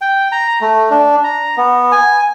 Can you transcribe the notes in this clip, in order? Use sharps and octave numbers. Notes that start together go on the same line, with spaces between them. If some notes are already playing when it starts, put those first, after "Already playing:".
G5
A#5
A3
D4
A#5
B3
G#5